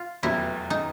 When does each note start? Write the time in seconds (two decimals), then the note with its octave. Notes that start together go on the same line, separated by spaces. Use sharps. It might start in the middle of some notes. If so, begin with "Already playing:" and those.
Already playing: F4
0.23 F1 E2 B2 F#3 E4
0.70 D#4